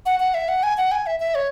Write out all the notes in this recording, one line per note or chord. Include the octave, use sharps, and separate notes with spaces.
F#5
F#5
E5
F#5
G#5
F#5
G#5
E5
E5
C#5